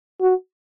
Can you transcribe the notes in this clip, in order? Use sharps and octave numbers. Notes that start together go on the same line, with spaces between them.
F#4